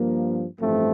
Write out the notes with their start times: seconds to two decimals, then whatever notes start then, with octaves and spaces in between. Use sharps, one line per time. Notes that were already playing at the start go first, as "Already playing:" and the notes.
Already playing: G2 F3 A#3
0.59 A1 G2 F3 A3 C4